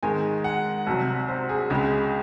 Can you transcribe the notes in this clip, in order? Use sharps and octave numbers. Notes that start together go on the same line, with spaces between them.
G#2 D#3 G#3 G#5
F#5
C2 C3 F#3
C5
G#4
C#2 C#3 G#3